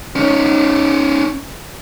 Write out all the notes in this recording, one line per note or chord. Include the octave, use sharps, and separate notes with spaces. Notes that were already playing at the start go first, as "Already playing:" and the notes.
C#4 D#4